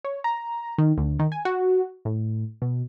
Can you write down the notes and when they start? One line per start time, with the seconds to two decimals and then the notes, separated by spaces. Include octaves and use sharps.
0.04 C#5
0.24 A#5
0.78 D#3
0.98 D2
1.19 D#3
1.32 G#5
1.45 F#4
2.05 A2
2.62 B2